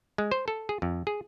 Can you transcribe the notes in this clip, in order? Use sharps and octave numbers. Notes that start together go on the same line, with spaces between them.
G#3
C5
A4
G#4
F2
G#4